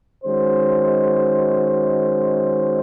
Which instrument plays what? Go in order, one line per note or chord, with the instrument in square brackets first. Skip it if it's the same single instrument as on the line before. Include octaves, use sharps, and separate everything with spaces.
[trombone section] D#3 G#3 C#4 F#4 C5